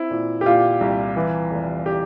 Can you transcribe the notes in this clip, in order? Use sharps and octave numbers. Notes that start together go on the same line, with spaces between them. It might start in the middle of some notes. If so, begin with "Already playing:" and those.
Already playing: C4 E4
A#2
G4
A#2 F4
C2
E3
F1
G4